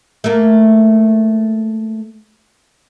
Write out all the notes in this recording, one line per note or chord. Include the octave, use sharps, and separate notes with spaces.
A3 A#3